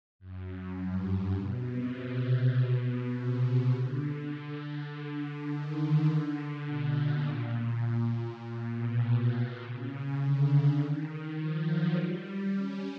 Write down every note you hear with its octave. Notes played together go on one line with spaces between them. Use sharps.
F#2
G2
G2
B2
C3
B2
C3
D3
D3
D#3
D3
B2
A#2
A#2
B2
B2
C#3
D3
D#3
F3
F#3
G3
C#4